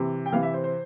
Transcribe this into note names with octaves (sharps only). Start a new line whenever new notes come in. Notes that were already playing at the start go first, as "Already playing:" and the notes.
Already playing: C3 E3
G5
C3 E3 F5
E5
C5
C5